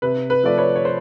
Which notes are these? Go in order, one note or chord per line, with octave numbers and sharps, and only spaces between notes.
C3 B4
B4
F3 A3 D5
B4 C#5
C#5
C5